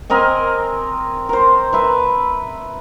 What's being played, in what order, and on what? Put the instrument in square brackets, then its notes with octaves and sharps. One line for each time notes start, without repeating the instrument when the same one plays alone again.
[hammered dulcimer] C4 A#4 D#5 G#5
A#4 C5
B4 E5 A#5